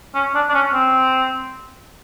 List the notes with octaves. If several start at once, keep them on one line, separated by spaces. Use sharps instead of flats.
C#4
D4
D4
C#4
C4